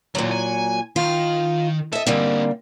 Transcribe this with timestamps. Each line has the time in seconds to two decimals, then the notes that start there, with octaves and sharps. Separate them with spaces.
0.15 D#2 A#2 F#3
0.31 G#5
0.96 D#3 F4
1.93 A4 D#5 E5
2.07 D3 G3 A#3 C4 D#4